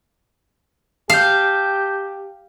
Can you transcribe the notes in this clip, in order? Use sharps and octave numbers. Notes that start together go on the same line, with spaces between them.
G4 F5 A5 G6